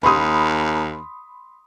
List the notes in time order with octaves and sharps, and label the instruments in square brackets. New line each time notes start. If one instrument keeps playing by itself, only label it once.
[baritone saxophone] D#2 [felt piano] B5 C6 D#6